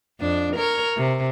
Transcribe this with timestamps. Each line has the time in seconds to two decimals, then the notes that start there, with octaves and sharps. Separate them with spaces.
0.20 F2 D4
0.56 A#4 C#5
0.97 C3